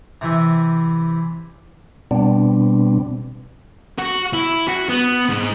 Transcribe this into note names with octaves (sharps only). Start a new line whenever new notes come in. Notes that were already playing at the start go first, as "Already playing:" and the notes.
C3 E3 E4
B2 G3 B3 C4 D4
F#4
E4
F#4
B3
G#2